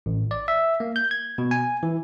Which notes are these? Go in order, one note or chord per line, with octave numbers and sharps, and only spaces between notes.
A1
D5
E5
A#3
G6
G#6
B2
G#5
E3